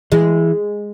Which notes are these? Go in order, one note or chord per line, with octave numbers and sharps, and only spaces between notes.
E3 G#3